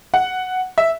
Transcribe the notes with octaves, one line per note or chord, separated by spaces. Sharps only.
F#5
E5